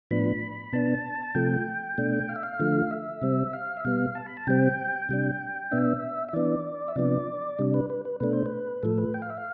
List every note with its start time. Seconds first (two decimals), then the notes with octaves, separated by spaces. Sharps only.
0.11 A2 F3 B3 D4 B5
0.73 B2 B3 D4 A5
1.35 C3 F3 A3 G5
1.98 B2 A3 D4
2.29 F5
2.36 E5
2.43 F5
2.60 D3 F3 A3
2.91 E5
3.22 C3 G3 C4
3.53 F5
3.77 E5
3.85 B2 G3 B3 F5
4.15 A5
4.26 B5
4.37 A5
4.47 C3 G3 C4 G5
5.09 C3 G3 D4
5.71 B2 B3 D4 E5
6.29 E5
6.33 E3 B3 D4 D5
6.88 E5
6.96 C3 F3 B3 D4 D5
7.59 C3 G3 D4
7.74 B4
7.90 B4
8.05 B4
8.20 B2 A3 D4 B4
8.33 C5
8.46 B4
8.83 A2 F3 A3 A4
8.98 B4
9.14 G5
9.22 F5
9.30 E5
9.37 F5